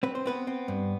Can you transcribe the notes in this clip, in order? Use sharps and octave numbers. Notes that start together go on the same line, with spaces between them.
C4 B4
C5
B3 C4 B4
C4
G2